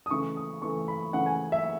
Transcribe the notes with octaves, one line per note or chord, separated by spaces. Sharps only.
D#6
C#3 E3 A3 C#6
D#6
C#3 E3 A3 C#6
B5
C#3 E3 A3 F#5
G#5
E5